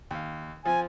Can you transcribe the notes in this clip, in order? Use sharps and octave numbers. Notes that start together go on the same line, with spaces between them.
D#2 F5
F3 C4 F4 G#5